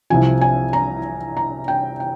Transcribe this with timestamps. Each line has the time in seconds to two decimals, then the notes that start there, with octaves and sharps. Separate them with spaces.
0.10 C2 C3 F3 G#5
0.41 G#5
0.73 A#5
1.37 A#5
1.68 G5
2.00 G5